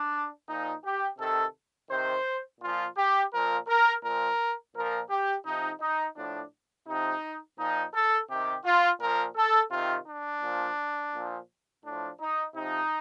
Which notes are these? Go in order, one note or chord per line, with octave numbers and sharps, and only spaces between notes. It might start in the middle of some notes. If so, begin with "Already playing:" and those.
Already playing: D4
A#2 F3 D#4
G4
C3 D#3 A4
C3 D#3 C5
A#2 F3 F4
G4
A#2 F3 A#4
A#4
A#2 F3 A#4
A#2 F3 A#4
G4
C3 F3 D#4
D#4
A2 F3 D4
C3 F3 D#4
A#2 F3 D#4
A4
C3 D#3 G4
F4
A#2 F3 A#4
A4
C3 D#3 F4
D4
A#2 F3
A#2 F3
A2 F3 D4
D#4
C3 F3 D#4